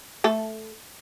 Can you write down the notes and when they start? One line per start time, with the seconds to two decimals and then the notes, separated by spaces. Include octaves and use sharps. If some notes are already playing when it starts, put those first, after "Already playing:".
0.24 A3 A4